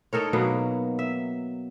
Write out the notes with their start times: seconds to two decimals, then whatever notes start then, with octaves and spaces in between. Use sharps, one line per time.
0.13 D#4 A4 A#4 C#5
0.33 B2 F#3 A#3 B3
0.99 E5